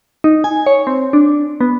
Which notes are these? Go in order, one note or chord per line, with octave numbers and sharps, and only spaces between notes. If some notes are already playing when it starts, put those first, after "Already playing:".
D#4
G#5
C#5
C4
D4
B3